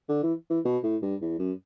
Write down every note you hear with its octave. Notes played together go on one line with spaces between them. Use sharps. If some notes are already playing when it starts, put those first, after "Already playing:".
D3
E3
E3
B2
A2
G2
E2
F#2